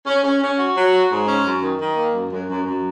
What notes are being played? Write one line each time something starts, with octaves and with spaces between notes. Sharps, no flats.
C#4
C#4
C#4
F#4
F#3
F#4
G#2
C#4
F#2
D#3
D#3
A#3
F#2
F#2
F#2
F#2